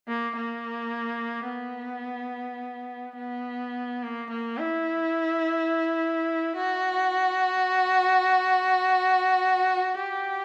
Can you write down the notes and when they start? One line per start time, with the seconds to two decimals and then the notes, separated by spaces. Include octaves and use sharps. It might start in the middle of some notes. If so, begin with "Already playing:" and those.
0.08 A#3
0.37 A#3
1.48 B3
3.18 B3
4.03 A#3
4.30 A#3
4.58 E4
6.56 F#4
9.94 G4